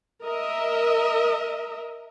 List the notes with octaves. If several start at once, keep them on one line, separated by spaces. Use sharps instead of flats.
A#4 D#5 E5